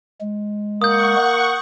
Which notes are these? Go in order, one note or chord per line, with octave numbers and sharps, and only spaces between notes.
G#3
A#3 F#5 C#6 D#6 G6